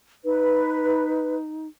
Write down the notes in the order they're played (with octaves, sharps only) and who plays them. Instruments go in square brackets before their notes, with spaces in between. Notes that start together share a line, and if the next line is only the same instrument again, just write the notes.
[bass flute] D#4 [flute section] B4